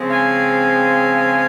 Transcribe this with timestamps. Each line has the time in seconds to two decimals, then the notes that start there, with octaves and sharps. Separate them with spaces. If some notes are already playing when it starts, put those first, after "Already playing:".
Already playing: C#3 F3 G#3 C4
0.09 F5 G#5